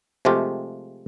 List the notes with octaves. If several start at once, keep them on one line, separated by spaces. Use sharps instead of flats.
C3 F3 G#3 A3 F4 G4